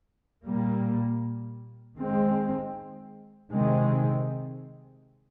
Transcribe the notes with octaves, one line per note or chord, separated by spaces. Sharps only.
A#2 G3 A#3
D#3 G#3 C4
C3 D#3 G#3 C4